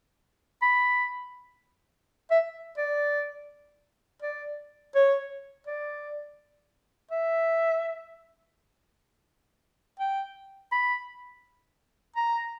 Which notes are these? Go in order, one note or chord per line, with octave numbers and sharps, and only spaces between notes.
B5
E5
D5
D5
C#5
D5
E5
G5
B5
A#5